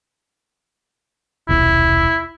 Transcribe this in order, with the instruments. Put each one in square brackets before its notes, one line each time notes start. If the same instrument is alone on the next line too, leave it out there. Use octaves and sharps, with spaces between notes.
[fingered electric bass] D#1 B1 [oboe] E4